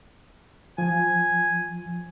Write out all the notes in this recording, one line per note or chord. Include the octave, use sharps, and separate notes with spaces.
F3 G#5